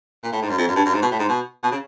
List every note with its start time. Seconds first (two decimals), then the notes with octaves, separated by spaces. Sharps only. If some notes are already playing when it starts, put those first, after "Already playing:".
0.23 A#2
0.32 A2
0.42 G#2
0.49 F#2
0.58 F2
0.67 F#2
0.76 G2
0.85 F#2
0.94 G#2
1.02 B2
1.11 A2
1.19 G#2
1.29 B2
1.63 B2
1.72 C#3